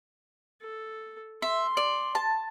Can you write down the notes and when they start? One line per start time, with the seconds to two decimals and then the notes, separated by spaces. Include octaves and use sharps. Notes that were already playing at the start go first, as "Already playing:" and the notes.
0.61 A4
1.42 E5 C6
1.77 D5
2.15 A5